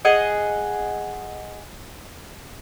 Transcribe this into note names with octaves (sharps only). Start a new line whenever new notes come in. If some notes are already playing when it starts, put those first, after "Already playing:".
G#4 D#5 F#5